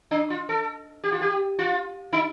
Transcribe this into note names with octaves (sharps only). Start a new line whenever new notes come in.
D4
F4
A4
G4
F4
G4
F4
D#4